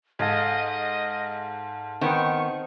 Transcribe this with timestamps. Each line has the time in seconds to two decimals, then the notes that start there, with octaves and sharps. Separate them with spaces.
0.19 G#2 A4 D#5 F5 G#5
2.01 D#3 B3 C4 D#4 C#6